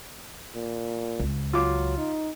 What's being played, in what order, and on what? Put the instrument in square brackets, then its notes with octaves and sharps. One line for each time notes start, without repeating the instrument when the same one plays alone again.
[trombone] A#2
[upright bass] C#2
[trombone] F#3 [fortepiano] F4 D6
[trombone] D#4